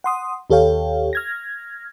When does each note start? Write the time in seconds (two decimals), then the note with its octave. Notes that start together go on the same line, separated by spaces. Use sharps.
0.04 F#5 C6 D#6
0.50 D#2 G4 A4 C#5 F5 G5
1.13 F6 G#6 A#6